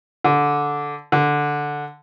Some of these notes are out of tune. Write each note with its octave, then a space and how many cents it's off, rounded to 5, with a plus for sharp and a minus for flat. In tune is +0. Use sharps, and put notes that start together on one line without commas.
D3 -10
D3 +0